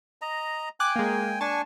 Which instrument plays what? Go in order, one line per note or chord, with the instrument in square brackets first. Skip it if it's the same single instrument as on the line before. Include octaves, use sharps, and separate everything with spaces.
[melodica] D#5 A#5
[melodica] G5 G#5 [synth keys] D6 F#6
[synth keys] G#3 A#3
[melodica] D4 G#5 C#6 [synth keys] A5